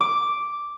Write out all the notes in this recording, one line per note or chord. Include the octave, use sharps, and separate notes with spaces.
D6